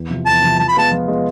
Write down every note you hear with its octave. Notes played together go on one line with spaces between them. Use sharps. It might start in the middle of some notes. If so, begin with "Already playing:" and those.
Already playing: E2
C3 F3
E2 A5
C3 F3
F3 A5
B5
G#3 B3 F4 A5
F3
G#3 B3 F4